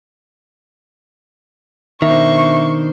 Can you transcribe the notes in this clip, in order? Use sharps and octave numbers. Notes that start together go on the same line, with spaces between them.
B2 D#3 D4 C5 E5 C#6